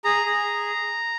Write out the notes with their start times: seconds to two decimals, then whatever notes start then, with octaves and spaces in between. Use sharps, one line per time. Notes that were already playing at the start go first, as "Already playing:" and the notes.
0.04 G#4 A#5
0.26 G#4